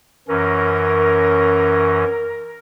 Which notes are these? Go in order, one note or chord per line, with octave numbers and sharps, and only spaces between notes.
F#2 E3 C#4 A#4